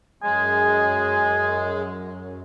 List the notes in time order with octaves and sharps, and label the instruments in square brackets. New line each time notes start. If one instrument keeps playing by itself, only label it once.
[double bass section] F#2 [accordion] G#3 [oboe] G#5